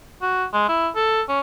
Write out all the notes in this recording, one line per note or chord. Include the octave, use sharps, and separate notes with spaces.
F#4
G#3
E4
A4
C#4